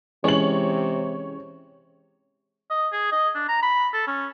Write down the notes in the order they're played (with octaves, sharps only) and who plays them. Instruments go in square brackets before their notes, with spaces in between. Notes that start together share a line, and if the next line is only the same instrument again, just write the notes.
[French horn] C3 [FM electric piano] E3 G#3 C#4 [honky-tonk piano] C#5 F#7
[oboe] D#5
G#4
D#5
D4
A#5
B5
A4
C#4